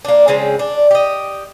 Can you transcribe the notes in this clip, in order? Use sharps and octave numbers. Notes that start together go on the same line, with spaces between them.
A#3 D4
C#3 F3 G#3 C4
D4
G4 D#5